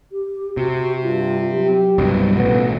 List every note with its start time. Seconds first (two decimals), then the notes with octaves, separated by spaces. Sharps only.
0.12 G4
0.57 C3 F#4
1.03 G2 F4
1.53 F#3 G4
1.98 C2 G2 B2
2.36 A1 B2 B3